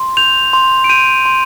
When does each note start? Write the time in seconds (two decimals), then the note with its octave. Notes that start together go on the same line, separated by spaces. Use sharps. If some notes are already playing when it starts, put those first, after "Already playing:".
Already playing: C6
0.17 G6 F7
0.53 C6
0.84 D7
0.89 G6 D#7
1.26 C6